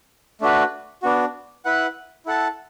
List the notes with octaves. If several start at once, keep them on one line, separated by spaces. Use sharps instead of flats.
A3 D4 F#4 B4
B3 D4 F#4
E4 B4 F#5
E4 A4 F#5 A5